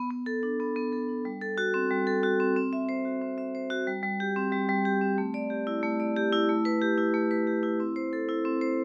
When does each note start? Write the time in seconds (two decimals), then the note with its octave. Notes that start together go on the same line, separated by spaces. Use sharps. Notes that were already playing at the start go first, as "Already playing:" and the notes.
Already playing: B3
0.10 B3
0.26 A4
0.43 D4
0.60 B3
0.76 B3
0.92 A4
1.09 D4
1.25 G3
1.41 A4
1.58 F#4
1.74 C4
1.91 G3
2.07 A4
2.23 F#4
2.40 C4
2.56 C4
2.73 E5
2.89 C5
3.05 F#4
3.21 C4
3.38 E5
3.55 C5
3.70 F#4
3.87 G3
4.03 G3
4.20 G4
4.36 C4
4.52 G3
4.69 G3
4.85 G4
5.01 C4
5.18 A3
5.34 D5
5.50 G4
5.67 E4
5.83 A3
6.00 D5
6.16 G4
6.33 E4
6.49 A3
6.65 B4
6.82 G4
6.98 E4
7.14 A3
7.31 B4
7.47 G4
7.63 E4
7.80 C4
7.96 C5
8.13 A4
8.29 E4
8.45 C4
8.61 C5